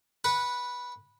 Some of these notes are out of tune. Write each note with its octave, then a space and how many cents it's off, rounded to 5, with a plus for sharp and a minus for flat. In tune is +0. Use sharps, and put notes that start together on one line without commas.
B4 -10 F#5 +0